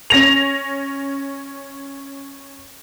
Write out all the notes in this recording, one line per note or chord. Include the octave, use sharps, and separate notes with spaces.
C#4 A#6 F7